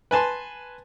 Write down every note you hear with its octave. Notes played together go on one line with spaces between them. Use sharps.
B4 G#5 A5 C6